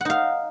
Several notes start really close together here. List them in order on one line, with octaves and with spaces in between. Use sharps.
F#5 D#4 F5